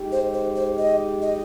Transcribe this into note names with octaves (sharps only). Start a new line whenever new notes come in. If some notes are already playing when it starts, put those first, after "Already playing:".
Already playing: G#3 D#4 G4
C5
C5
C5
D#5
D#5